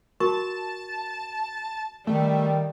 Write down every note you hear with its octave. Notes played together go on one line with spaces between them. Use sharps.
F#4 A#4 A5 C#6
D#3 G3 A3